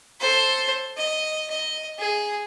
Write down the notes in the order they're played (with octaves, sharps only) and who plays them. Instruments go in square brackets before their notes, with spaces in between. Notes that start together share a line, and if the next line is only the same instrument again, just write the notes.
[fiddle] A4 C5
D#5
D#5
G#4